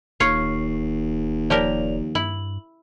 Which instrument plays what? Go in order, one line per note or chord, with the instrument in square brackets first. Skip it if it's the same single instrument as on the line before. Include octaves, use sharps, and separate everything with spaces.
[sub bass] D1 [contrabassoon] D#2 [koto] F4 C#5 [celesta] C7
[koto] F3 G4 A#4 [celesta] C#5 D5 F7
[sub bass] G2 [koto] E4 [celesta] F#7